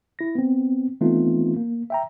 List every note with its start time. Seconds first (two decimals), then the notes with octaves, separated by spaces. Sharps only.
0.19 E4 A#6
0.35 B3 C4
1.01 E3 A3 B3 C4 D#4 F4
1.56 A#3
1.90 E5 G5 A#5